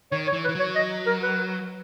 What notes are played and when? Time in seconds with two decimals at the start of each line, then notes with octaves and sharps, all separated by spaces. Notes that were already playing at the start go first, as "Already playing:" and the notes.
0.12 D#3 C#5
0.28 C#5
0.33 E3
0.44 B4
0.49 E3
0.55 F#3 C#5
0.76 D#5
1.07 A#4
1.23 B4